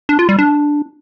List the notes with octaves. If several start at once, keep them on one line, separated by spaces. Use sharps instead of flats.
D4
F4
G3
D4